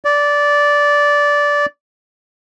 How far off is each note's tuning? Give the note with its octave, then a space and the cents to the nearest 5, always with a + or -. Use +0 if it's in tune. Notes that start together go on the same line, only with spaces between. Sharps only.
D5 -15